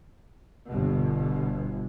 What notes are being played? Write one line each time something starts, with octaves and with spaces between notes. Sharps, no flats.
G1 B2